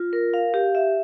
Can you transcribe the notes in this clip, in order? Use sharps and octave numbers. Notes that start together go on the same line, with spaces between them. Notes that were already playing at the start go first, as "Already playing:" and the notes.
Already playing: F4
A#4
F5
G4
E5